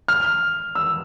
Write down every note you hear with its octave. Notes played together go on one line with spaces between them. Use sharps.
F6
E6